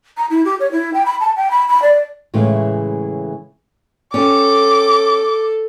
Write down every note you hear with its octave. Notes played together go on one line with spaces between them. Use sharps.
A#5
E4
G4
C#5
E4
G5
B5
A5
G5
B5
B5
D5
A2 C#3 E3 G#3 A3
C#4 G4 A4 D6